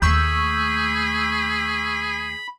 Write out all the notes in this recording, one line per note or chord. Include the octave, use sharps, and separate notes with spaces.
D#2 A3 G#4 B5 C#6 E6 G6